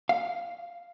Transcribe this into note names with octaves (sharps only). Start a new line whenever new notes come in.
F5